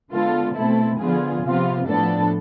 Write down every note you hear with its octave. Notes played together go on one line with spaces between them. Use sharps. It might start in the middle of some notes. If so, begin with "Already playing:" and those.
D3 G#3 B3 F4 A4
B2 A3 C4 E4 A4
D3 F3 B3 F4 G#4
C3 F3 B3 F4
A2 F3 B3 D4 A4